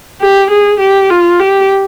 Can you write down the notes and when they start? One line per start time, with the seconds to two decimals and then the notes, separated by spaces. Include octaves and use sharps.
0.21 G4
0.51 G#4
0.80 G4
1.10 F4
1.39 G4